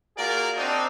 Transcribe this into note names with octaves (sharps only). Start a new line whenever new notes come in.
A#3 F4 F#4 G#4 A#4 D5
C4 D4 D#4